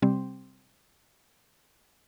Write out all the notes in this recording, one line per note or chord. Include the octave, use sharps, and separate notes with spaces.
C3 G3 C4